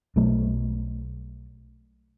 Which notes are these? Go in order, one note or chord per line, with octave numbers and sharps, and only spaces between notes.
B1 F#3 A3